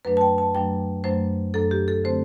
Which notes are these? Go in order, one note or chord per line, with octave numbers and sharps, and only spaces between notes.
F#2 F#3 A3 D4 B4
A5
G5
A5
F#2 F#3 A3 D4 G5
F#2 F#3 A3 D4 C5
F#2 F#3 A3 D4 A4
G4
A4
D3 A3 C4 C5